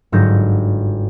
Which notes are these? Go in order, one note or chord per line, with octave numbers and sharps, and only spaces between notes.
G1 G#2 F#3 G6 A#6